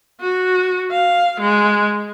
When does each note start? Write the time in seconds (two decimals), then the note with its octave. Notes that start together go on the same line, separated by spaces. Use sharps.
0.20 F#4
0.91 F5
1.40 G#3